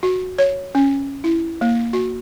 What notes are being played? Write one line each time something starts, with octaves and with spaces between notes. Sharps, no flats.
F#4
C#5
C#4
E4
A#3
F#4